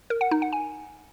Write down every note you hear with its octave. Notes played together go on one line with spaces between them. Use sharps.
A#4
F#5
D#4
F#5
G#5